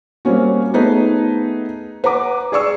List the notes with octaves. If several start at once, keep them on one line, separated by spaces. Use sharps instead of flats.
G3 A#3 C4 C#4 F#4
A3 B3 D#4 G#4 B4
B4 F#5 A#5 D6
G#4 D5 C#6 E6